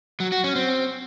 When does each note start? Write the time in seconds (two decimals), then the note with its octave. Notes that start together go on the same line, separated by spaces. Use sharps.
0.20 F#3
0.32 F#4
0.44 C#4
0.56 C4